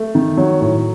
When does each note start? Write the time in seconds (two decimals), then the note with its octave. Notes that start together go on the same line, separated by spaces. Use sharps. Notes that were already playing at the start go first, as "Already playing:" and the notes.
Already playing: A3
0.15 D#3
0.37 F#3
0.61 A2